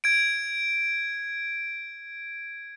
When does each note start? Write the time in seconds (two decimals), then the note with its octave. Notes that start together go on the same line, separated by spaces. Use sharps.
0.04 G#6 D7